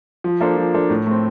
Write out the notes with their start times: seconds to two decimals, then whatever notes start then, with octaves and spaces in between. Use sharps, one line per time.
0.24 F3
0.41 A#3 D4 A4 C5
0.57 F3
0.74 A#3 D4 A4 C5
0.90 A2
1.07 A3 C4